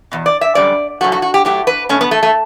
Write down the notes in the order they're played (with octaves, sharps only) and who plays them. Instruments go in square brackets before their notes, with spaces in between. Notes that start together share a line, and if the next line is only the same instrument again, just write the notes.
[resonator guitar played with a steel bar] E2 B2
D5
E5
F#2 D3 G3 D5
F#2 C#3 F#3 A3 F#4
F#4
F#4
G4
A2 F#3 A3 G4
B4
B2 A3 C#4
B3
A3
A3